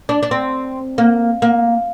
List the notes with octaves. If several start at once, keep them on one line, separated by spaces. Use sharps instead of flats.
D4
D4
C4
A#3
A#3